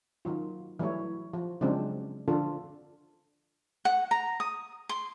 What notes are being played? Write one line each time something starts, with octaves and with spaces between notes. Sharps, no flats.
D#3 F#3 F4
E3 F#3 G3 A3 E4 C#5
F3
C#3 F3 F#3 G#3 C4 D4
D3 F3 D4 F4 A4
F#5
A#5
D#6
C6